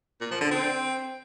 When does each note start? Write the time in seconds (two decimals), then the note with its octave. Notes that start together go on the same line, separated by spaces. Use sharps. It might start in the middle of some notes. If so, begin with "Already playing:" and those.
0.21 A#2
0.31 F3
0.41 D3
0.51 C4